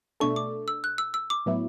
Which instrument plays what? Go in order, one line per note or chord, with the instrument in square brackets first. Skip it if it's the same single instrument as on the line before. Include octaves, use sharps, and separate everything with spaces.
[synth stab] B2 A3 D4 A4 [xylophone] C#6
[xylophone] D6
E6
F#6
E6
E6
D6
[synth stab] A2 F#3 B3 E4